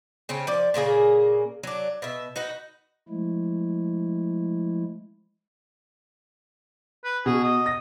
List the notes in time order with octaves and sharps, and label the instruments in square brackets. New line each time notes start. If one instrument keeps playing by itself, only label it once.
[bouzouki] C#3 C4 C#4
F3 D5
A#2 C#3 A#3 G#4
F#3 D4
B2 E5
D#4 F#4 B4
[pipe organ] F3 G#3 A3 E4
[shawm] B4
[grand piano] B2 [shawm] G#4
[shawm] D#5
[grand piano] A#6